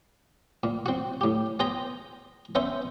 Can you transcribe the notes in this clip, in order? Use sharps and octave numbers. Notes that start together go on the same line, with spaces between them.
A#2
C4 F#4
A2 G4
B3 G#4 C5 G5 A#5
B3 C#4 C5 E5